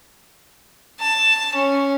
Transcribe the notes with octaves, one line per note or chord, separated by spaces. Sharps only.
A5
C#4